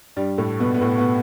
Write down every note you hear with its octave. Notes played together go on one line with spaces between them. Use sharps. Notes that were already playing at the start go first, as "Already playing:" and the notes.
G2 G3
A2 A3
B2 B3
B3
A2 A3
B2 B3